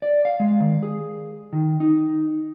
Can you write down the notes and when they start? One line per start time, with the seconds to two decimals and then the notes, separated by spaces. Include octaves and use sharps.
0.02 D5
0.25 F5
0.40 G#3
0.60 D#3
0.83 G#4
1.53 D#3
1.80 D#4